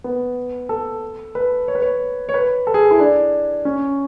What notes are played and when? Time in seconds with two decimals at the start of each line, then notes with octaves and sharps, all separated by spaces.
0.04 B3
0.69 A4
1.35 B4
1.68 C#5
1.75 B4
1.82 C#5
2.29 C#5
2.34 B4
2.67 A4
2.74 G#4
2.91 E4
2.99 D4
3.65 C#4